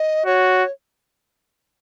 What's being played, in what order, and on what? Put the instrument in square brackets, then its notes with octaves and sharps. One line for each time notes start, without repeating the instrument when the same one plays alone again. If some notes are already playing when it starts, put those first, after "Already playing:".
Already playing: [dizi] D#5
[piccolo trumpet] F#4 [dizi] C#5